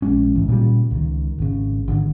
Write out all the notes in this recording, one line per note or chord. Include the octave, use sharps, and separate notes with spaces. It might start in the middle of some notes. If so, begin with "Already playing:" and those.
A#1 G#3 C#4
C#2 G#2 E3
A#2 C#3 G3
C#2 D#3
G#1 C#3
G#1 D3 D4